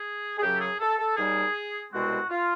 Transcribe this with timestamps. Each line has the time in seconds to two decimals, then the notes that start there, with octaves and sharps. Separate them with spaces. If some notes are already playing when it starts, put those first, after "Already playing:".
Already playing: G#4
0.38 G#4
0.42 F#2 C#3 F#3 G4
0.56 A4
0.61 G#4
0.80 A4
0.98 A4
1.17 D#2 D#3 G3 G#4
1.92 C2 B2 G#3 C4 F#4
2.30 F4